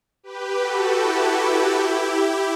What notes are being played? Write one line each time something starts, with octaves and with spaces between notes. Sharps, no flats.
G4 B4
F#4 A4
E4 G4
E4 G4